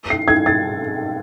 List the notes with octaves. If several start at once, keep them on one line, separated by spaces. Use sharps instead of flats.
C7
G#6
A6